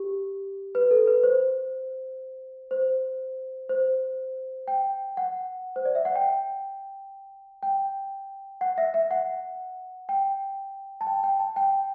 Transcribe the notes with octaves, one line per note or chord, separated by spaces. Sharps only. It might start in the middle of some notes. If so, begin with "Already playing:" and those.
Already playing: G4
B4
A4
B4
C5
C5
C5
G5
F#5
C5
D5
E5
F#5
G5
G5
F#5
E5
E5
F#5
G5
A5
G5
G5
A5
G5